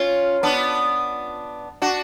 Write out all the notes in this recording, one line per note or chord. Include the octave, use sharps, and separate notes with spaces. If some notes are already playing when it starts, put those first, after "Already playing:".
Already playing: C#4 F4
B3 D4
D4 F#4